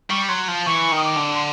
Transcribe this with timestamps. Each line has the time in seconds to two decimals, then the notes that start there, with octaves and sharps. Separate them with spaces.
0.10 G3 C#6
0.28 F#3 C6
0.48 F3
0.66 E3 C#6
0.92 D#3 D#6
1.05 D6
1.17 D3
1.35 C6